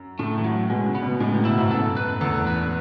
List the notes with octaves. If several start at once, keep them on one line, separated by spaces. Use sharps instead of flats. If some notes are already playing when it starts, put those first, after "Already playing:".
Already playing: F#2
A2 A3
E3
F#3
B2 G#3
C#3
B3
B2
A2 G#3
C#3
B2 E4
G#2
F#2 A4
B4
E2 A4
B4